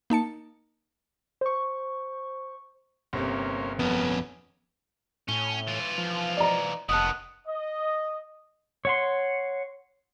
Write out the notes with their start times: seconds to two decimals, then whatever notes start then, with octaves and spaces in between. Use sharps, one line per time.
0.10 A#3 D#4 A5 C#7
1.41 C5 C#6
3.13 G1 C3 A#3 C#4 C5
3.79 F2 A#3 B3 C#4
5.29 A2 C#4 G7
5.68 E3 F4
5.98 F3
6.37 D5 D#5 A#5
6.89 F1 D#3 B3 D#5 A5 D#6 F#6
7.47 D#5
8.85 C#5 F#5 C6